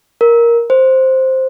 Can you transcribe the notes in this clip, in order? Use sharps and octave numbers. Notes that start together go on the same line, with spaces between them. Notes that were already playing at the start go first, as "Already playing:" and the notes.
A#4
C5